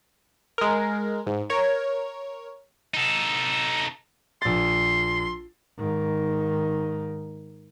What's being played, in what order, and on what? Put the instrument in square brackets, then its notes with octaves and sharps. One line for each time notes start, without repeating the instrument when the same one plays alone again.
[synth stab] G#3 A#4
G#2
A#4 C#5 G#6
[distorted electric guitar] D#4 A4
[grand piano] A#1 A6 [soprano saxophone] C6
[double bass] G#2 D#3